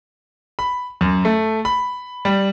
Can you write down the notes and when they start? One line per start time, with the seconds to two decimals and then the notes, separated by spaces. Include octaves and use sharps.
0.59 B5
1.01 F#2
1.25 A3
1.65 B5
2.25 G3